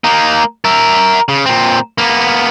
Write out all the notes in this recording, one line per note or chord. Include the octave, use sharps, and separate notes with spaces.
A#3 D#4
A#4 E5
C#3
A#2 C4
A#3 B3